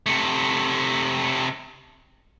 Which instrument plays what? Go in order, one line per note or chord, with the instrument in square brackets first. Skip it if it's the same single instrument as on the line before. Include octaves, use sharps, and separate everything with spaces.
[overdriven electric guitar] C3 A3